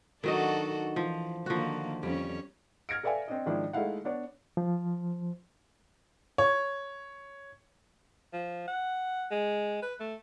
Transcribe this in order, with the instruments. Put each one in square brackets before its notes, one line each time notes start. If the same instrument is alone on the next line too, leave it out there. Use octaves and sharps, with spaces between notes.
[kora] D#3 F#3 D#5 [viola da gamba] D4 F#4 A4
[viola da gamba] E3 [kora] F3
[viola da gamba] D3 D#3 A#3 [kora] F3 F#4
[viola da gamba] F2 C#4 C#5 [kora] G3
[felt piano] F6 G#6 A#6 C#7 D7
A4 B4 D5 E5 F5 G#5
C4 D4 D#5
G#2 D#3 F3 D4 E4
G#3 A3 D#4 E4 F5 F#5
B3 D4 C#5 D5
[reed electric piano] F3
[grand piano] C#5
[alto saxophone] F3
F#5
G#3
B4
A3